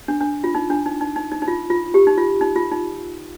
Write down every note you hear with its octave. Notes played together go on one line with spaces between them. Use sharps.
D4
D4
F4
D#4
D4
D#4
D#4
D#4
D#4
D#4
F4
F4
G4
D#4
F4
D#4
F4
D#4